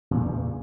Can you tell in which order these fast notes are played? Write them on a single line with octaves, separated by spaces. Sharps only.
A#2 G2 C#3 E2